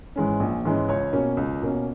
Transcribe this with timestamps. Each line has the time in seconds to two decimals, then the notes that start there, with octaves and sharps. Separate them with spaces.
0.16 G#2 E3 G#3 C#4
0.40 A#1
0.65 G#2 E3 G#3 C#4
0.88 C#2 C#5
1.13 B2 A#3 C#4
1.37 C#2
1.62 B2 A#3 C#4